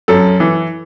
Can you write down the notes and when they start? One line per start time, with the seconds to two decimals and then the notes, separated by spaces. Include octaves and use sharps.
0.08 F#2 A4
0.40 E3